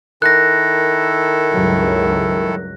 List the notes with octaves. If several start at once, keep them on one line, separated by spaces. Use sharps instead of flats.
D#3 E4 A4 A#4 F#6 A#6
C#2 G2 F#3